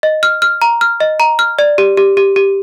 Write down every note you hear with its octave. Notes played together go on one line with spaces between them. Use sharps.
D#5
F6
F6
A#5
F6
D#5
A#5
F6
D5
G4
G4
G4
G4